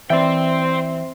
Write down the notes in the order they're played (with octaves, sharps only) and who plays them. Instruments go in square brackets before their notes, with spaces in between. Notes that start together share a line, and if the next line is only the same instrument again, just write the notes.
[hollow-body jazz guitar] E3 D5 [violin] C4 [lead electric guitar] C5 G5 [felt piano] E5